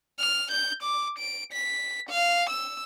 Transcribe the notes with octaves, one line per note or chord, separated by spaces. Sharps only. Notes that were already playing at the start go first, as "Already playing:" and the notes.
F6
G6
D6
D7
B6
F5
E6